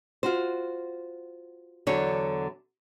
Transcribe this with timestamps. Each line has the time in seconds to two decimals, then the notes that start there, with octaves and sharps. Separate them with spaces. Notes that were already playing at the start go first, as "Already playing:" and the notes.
0.23 F4 F#4 C5
1.87 E2 D3 F#3 D4 C#5